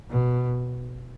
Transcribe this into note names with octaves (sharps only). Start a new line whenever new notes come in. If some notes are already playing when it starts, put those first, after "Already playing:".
B2